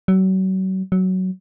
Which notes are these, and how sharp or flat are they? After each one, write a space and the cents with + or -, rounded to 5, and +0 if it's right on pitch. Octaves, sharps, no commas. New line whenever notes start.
F#3 +35
F#3 +10